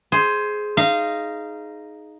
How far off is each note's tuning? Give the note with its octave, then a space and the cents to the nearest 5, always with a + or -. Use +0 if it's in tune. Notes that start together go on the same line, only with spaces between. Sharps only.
G#4 +15 C5 +0
D#4 +0 F5 -20